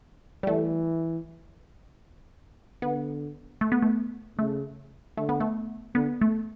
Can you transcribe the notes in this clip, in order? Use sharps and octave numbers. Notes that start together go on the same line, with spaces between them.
G3
E3 A3
D3 B3
A3
B3
A3
C#3 A3
D3 A3
B3
A3
D3 B3
A3